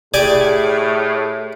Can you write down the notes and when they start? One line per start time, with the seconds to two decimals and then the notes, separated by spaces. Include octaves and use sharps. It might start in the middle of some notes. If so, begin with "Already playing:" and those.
0.14 A2 G4 G#4 D5 G#5